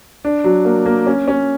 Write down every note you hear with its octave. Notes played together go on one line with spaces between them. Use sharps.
D4
F#3
A#3
A#3
C#4
C#4